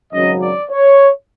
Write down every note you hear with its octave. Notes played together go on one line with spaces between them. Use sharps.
G#1 F#2 C#3 F#3 D#5
D5
C#5